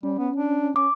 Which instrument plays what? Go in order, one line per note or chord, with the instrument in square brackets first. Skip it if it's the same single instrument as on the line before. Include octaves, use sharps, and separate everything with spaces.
[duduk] G3 [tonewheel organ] C#4
[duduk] B3
D4
[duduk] C#4 [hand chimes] D6